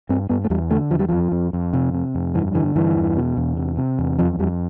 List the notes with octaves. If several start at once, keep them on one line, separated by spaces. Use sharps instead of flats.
G2 C4
G2 B3
A3
E2 G3
D3 A3
E2 F3
G3
F2 F3
F2
F2
C3
C3
F2
G2 E3
D3 E3
G2 E3
E2
B2
E2
C3
C3
E2
F2 F3
F2 G3